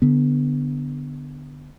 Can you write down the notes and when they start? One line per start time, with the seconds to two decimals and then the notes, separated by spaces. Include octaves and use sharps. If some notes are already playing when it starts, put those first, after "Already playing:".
0.02 D3 B3